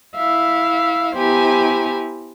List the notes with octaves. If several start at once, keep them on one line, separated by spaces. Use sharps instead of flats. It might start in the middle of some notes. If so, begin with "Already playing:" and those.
E4 E5 F5
B3 E4 G4 C5 G#5 A#5